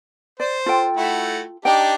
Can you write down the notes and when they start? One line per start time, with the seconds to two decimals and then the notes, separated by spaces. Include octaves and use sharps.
0.40 C5 D5
0.66 F4 A4 G5
0.97 A3 E4 F#4
1.65 D4 D#4 G4 G5